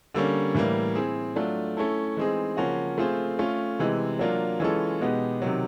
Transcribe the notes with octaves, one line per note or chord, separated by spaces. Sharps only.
D3 G3 A#3 C#4
A2 E3 G3 A#3
C4 E4 G#4
F#3 A3 D4 F4
A3 C#4 E4 A4
E3 G#3 C4 D#4 G#4
C#3 F3 A#3 C#4 F#4
A3 C4 F4 G#4 C5
A3 C#4 F4
C3 E3 G#3
F#3 A#3 D4 F4
E3 G#3 C#4 F4 A4
B2 G#3 B3 D#4 G4
C3 D#3 F#3